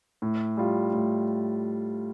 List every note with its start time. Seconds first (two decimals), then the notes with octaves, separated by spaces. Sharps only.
0.22 A2
0.57 G3 F4
0.93 A2